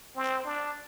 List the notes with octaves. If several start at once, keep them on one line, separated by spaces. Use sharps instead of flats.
C4
D4